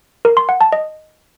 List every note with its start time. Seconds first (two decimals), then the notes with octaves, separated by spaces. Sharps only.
0.25 A#4
0.37 C6
0.49 F#5
0.61 A5
0.72 D#5